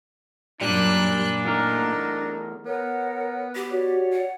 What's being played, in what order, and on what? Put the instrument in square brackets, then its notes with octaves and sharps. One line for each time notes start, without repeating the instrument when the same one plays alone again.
[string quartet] F#2 B5 F#6 [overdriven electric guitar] A#2 [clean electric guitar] G3 [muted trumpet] D4
[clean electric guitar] E2 A3 A#4 [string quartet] D#4
[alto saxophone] B3 [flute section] A#4 C#5 F#5
[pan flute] G4
[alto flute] F#4 [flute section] C#5 D5
[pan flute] F#5